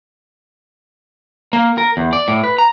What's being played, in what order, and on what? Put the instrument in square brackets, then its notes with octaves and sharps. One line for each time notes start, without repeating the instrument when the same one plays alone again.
[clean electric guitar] A#3
A#4
E2
D5
A2
B4
A#5